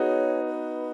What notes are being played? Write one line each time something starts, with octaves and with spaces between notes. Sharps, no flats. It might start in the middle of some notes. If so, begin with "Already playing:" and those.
Already playing: B3 D#4 F#4 G#4 C#5
B4